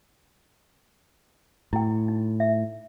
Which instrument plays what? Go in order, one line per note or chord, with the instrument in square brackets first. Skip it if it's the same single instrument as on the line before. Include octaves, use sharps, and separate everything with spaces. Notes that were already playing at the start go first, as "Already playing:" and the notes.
[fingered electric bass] A2 [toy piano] E4 G5
[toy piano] D#4
E5